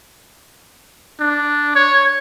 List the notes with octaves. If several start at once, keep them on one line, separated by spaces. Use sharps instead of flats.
D4
C#5